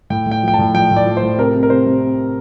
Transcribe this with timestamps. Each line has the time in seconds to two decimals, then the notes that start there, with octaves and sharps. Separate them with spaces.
0.10 A2 G5
0.27 A2 G5
0.43 F3 G5
0.54 A5
0.59 A2
0.74 F3 G5
0.91 A2
0.97 D5
1.06 F3
1.17 C5
1.23 A2
1.38 C3 A#4
1.54 C3
1.63 A#4
1.70 C3 C5
1.86 C3